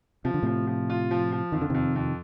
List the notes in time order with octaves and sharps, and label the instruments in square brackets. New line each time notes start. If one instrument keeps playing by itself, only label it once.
[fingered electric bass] C3 [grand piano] F3
[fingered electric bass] D3
[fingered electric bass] A2 C3 [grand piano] F3
[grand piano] F3
F4
F3
F3
[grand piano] F2 [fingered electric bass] D#3
[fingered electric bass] D3
[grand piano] F2 [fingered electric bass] C3 D#3
[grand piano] F2